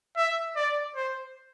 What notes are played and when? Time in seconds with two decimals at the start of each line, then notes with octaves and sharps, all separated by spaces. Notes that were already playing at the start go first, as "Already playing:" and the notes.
0.17 E5
0.56 D5
0.96 C5